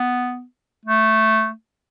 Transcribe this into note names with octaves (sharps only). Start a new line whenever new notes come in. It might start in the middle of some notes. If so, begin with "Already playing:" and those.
Already playing: B3
A3